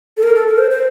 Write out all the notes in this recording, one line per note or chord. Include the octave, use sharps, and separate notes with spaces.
A4
A#4
A4
A#4
C5
C5